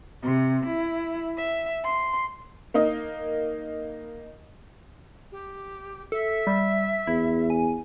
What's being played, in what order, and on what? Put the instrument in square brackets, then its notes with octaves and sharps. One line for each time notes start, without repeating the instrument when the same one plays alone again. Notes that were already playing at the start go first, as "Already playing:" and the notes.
[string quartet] C3
E4
E5
C6
[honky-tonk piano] A#3 D#4
[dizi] G4
[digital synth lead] A4 [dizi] E5
[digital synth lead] G3
[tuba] E2 [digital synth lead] E4
[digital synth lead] G#5